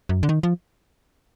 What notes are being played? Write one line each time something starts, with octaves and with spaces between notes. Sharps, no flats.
F#2
D3
D#3
F3